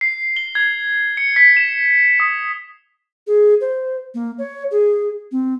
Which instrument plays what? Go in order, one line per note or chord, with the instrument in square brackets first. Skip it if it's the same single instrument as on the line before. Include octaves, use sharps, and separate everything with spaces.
[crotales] C7
G7
G#6
C#7
B6
E7
D#6
[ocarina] G#4
C5
A#3
C#5
G#4
C4